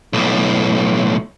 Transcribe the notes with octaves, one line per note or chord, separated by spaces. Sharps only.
B1 A2